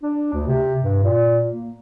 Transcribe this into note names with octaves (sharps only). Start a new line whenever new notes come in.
D4
D2
C3
G2
A#2
A#3